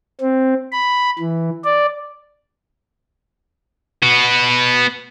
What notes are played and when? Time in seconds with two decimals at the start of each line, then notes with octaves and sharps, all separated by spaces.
0.21 C4
0.72 B5
1.19 E3
1.64 D5
4.03 B3 F#4